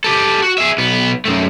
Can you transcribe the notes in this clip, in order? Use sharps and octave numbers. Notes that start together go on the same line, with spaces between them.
G4 A4
F#4
G#4 E5
B1 B3
F#2 A3